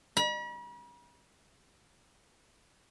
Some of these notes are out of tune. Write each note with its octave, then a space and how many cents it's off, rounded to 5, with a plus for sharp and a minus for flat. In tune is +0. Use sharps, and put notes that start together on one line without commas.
B5 -45